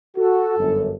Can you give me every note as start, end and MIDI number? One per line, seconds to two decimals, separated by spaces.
0.17 0.58 66
0.17 0.95 69
0.59 0.92 31
0.59 0.92 42